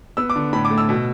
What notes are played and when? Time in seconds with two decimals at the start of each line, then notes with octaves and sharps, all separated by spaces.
0.17 B3 E6
0.30 D6
0.36 D3
0.53 A2 B5
0.65 D6
0.70 A3
0.78 E6
0.89 B2